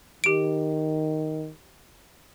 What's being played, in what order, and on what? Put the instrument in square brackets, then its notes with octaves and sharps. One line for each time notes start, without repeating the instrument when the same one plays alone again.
[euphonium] D#3 [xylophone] G4 D7